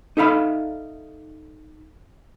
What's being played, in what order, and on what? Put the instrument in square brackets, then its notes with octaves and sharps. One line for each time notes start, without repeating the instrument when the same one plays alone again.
[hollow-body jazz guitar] D#4 A4 E5 F5 B5